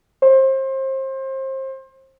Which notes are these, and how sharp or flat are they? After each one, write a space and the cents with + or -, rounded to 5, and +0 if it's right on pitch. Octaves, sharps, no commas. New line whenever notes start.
C5 +30